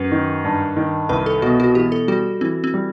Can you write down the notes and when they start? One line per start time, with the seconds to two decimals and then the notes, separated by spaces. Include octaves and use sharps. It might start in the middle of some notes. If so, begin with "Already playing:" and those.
Already playing: F#2 B4
0.12 D#3
0.44 G2
0.77 D#3
1.09 C2 B4
1.26 A4
1.42 B2 F#4
1.60 F#4
1.75 E3 G4
1.92 A4
2.08 G3 F#4
2.41 E3 C4
2.64 C4
2.74 G3